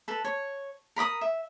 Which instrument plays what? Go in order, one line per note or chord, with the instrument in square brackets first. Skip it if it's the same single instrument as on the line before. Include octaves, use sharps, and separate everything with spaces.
[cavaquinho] A4 B4
C#5
A#4 B5 D6 D#6
E5